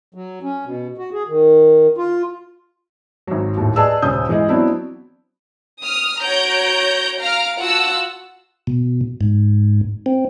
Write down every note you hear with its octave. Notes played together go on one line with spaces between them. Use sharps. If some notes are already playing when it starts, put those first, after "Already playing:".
F#3
C#4
B2
F#4
G#4
D#3
F4
G#1 F#3
D#2 A2
G#4 B4 D5 D#5 A5 E6
D#1 C#2 C#4 D#6 G6
E3 G#3 G#4 D#5
F#3 B3 C4 D4 E4
D#6 F6
F#4 C#5 A#5 G6 D7
F5 A#5 F6 D7
F4 F#4 F#5 A5 E6
B2
G#2
C4